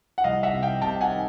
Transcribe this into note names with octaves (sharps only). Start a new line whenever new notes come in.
F#5
C2 D#5 F5
E5 F#5
C3
F5 G5
C3 G5 A5
F#5 G#5
D#3